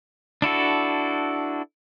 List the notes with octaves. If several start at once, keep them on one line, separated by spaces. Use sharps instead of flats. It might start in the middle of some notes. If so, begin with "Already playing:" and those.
D4 E4 F#4 A4